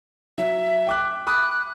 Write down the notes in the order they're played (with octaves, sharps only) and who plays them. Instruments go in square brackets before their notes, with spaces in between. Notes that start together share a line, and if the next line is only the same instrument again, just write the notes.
[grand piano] F#3 [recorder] E5
[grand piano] G5 D6 F#6
[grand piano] B5 D6 D#6 [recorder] F#6